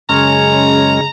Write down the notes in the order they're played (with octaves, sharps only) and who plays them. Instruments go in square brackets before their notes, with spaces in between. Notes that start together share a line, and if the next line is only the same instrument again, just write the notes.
[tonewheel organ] F#2 G#3 C#4 [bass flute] C#3 [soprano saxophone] A#5